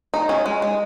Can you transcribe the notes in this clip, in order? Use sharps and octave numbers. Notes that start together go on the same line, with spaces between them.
D#4
C#4
G#3
G#3